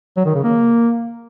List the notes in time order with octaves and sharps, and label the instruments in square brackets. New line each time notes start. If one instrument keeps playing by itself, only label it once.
[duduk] F#3
D#3
C#3
A#3